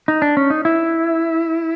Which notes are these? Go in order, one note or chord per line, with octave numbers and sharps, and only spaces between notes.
D#4
D4
C#4
D#4
E4